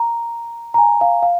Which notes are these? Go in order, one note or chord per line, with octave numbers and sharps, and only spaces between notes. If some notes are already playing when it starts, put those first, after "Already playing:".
Already playing: A#5
A#5
G#5
F5
F5